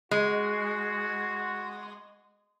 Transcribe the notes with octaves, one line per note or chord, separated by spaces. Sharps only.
G#3 F#4